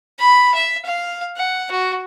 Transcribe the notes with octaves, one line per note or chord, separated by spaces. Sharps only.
B5
E5
F5
F#5
F#4